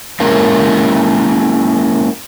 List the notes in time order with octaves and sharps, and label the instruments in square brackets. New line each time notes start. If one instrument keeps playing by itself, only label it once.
[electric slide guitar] G#3 A#3 C#4 E4 A#4 F5